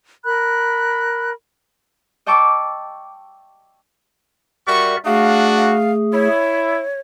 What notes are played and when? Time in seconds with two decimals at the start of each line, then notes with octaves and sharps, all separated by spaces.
0.25 A#4 B5 F#6
2.26 D#5 G5 A5 C#6 D6 E6
4.67 G3 F#4 A#4 D5 E5 C#6
5.05 A3 D4 F#4 G#4 F5
5.56 F5
6.13 E4 C#5